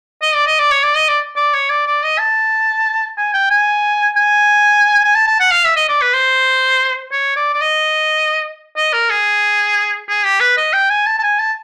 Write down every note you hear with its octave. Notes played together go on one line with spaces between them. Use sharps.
D#5
D5
D#5
D5
C#5
D5
D#5
D5
D5
C#5
D5
D5
D#5
A5
G#5
G5
G#5
G#5
G#5
A5
A5
F#5
F5
E5
D#5
D5
B4
C5
C#5
D5
D5
D#5
D#5
A#4
G#4
G#4
G4
B4
D#5
G5
G#5
A5
A5
G#5
A5